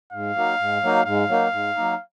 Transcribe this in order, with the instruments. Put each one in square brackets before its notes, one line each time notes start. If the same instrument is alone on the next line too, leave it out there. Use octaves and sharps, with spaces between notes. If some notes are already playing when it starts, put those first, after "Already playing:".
[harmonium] G#2 [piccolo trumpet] F5
[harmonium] F#3 A#3 D#4
G#2
F#3 A#3 D#4
[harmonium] G#2 [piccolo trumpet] F5
[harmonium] F#3 A#3 D#4
G#2
F#3 A#3 D#4